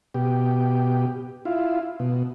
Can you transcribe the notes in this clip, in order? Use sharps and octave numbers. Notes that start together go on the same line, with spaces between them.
B2 G4
E4 F4
B2